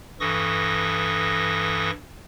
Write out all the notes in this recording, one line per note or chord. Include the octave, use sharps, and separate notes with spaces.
G2 E3 A4 C#6 D#6 A#6